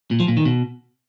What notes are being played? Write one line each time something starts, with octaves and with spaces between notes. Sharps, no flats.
A#2
F3
A#2
D#3
B2